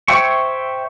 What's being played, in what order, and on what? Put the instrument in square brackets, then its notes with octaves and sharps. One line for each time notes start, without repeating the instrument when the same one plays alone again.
[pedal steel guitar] C5 C#5 E5 G5 C#6